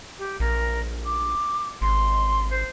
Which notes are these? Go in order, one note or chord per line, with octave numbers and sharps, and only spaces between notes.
G4
A#1 A#4
D6
G#1 C6
C5